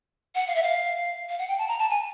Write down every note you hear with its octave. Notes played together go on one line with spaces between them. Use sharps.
F#5
F5
E5
F5
F5
F#5
G5
A5
A#5
A5
G#5